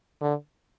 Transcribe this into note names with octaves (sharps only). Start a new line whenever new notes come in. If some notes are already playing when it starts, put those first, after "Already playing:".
D3